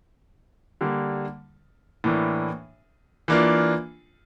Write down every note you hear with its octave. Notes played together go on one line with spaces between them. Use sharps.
D3 G3 A#3
A2 E3 A#3 D4
E3 A#3 D4 F4